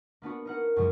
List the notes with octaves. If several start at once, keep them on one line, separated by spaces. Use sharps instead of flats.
A#3 B3 D4 F#4
D#4 A#4 F#5
F#2 A2 C#3 F#3 G#3